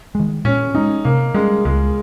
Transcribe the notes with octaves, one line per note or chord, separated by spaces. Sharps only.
D#3 G#3
A#2 C#4
G#3 C#4 D#4
C3 A#3
G3 G#3 A#3 C#4
C#2 G#3